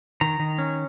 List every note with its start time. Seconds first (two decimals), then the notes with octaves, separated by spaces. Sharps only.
0.21 D#3 A#5
0.40 D#3
0.58 C#4